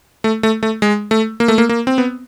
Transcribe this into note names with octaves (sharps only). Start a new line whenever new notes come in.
A3
A3
A3
G#3
A3
A#3
A3
A#3
A#3
C4
B3